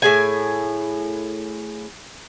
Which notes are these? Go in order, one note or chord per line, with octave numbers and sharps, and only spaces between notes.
A2 G#4 G#5